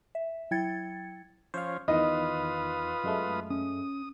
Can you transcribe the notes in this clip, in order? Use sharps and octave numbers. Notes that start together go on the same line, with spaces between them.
E5
F#3 E4 G5 G#6 A6 C#7
F3 C#4 C5 F5
E2 D#3 F4 B4 D#5 D#6
F#2 G#3 A3
C#4 D#6